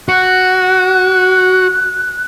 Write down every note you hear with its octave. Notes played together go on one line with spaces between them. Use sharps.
F#4 F#6